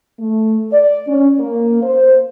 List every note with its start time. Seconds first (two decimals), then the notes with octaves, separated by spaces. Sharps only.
0.19 A3
0.72 D5
1.07 C#4
1.39 A#3
1.83 C5